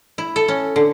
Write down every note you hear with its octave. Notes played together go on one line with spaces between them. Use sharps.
E4
A4
C#4
D3